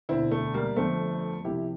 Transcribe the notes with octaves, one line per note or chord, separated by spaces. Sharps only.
E1 D2 D3 C4 E4
A3
G3 A#3
G1 F2 D3 F3 A3 C4
C2 C3 F3 E4 G4